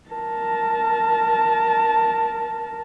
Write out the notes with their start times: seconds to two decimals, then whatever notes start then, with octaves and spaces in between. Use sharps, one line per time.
0.10 A#4 A5